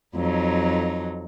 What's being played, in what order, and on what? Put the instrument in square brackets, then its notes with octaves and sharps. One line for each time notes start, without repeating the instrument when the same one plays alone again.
[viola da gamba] F2 F#3 D#4